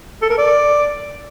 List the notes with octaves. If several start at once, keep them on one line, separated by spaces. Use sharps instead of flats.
A4
A#4
D5